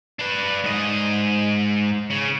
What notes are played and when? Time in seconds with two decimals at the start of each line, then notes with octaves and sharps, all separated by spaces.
0.19 D4 B4
0.64 G#2 D#5
2.11 C#3